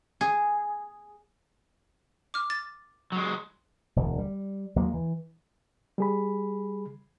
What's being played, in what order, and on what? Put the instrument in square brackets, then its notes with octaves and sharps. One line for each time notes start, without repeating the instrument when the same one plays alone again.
[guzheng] G#4
[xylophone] D6 F6
A6
[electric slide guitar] F#3 G#3
[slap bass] E1 D2
G3
D#2 F#3 G#3 A#3
E3
[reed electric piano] G3 G#4 B5